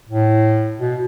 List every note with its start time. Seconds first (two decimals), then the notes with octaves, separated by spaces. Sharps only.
0.09 A2
0.80 B2